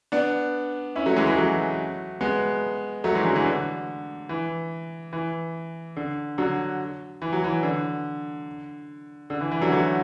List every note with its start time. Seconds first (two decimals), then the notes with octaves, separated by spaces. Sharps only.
0.12 B3 D4
0.96 C#4 E4
1.06 F#3 A3
1.16 E3 G#3
1.27 E3 G#3
1.37 F#3 A3
2.21 G#3 B3
3.04 F#3 A3
3.15 E3 G#3
3.25 D3 F#3
3.35 E3
3.46 D3
4.29 E3
5.13 E3
5.96 D3
6.38 D3 F#3
7.22 E3
7.33 F#3
7.44 E3
7.63 D3
9.30 D3
9.41 E3
9.51 E3
9.61 D3 F#3
9.72 F#3 A3